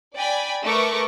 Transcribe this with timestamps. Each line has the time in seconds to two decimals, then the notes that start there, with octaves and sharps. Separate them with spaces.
0.17 D5 G5 G#5 B5
0.64 A3 A#4 B4 C#6 D6